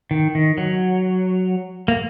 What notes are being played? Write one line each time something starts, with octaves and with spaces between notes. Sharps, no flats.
D#3
D#3
F#3
A#3